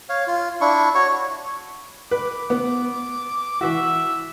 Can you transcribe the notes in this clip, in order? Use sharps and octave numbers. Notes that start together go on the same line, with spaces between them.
C#5 F5
F4
D4 E4 C#6
F#4 C#5 C#6
B4 D6
B3
E3 F#4 E5